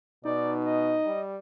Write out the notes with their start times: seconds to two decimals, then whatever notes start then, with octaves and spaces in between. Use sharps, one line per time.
0.25 B2 D#4 D5
0.65 D#5
1.06 G3